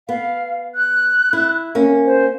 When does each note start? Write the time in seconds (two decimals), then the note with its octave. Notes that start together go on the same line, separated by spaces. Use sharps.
0.09 B3 F5
0.75 F#6
1.33 E4
1.75 A#3 C#4
2.06 C5